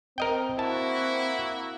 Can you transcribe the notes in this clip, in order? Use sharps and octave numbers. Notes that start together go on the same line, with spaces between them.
C4 A#4 D#5 G5
A#3 E4 F#4 A5